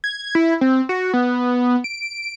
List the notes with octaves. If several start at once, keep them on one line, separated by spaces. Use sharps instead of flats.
G#6
E4
C4
F#4
B3
D7